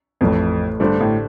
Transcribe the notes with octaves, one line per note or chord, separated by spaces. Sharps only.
A1 F2 A2 A3
G2 D3 A3 D4 G4 C5
A2